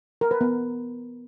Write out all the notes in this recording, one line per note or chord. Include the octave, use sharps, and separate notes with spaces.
A#4
B4
B3